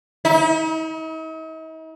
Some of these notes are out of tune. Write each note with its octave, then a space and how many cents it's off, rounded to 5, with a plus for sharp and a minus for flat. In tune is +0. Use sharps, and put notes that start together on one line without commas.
D#4 +45